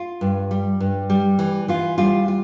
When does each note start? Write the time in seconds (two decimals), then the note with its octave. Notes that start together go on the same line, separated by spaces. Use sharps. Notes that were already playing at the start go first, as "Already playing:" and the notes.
Already playing: F4
0.21 G2
0.51 G3
0.80 G2
1.10 G3
1.39 E3
1.68 E3 F4
1.98 G3 F4
2.28 F4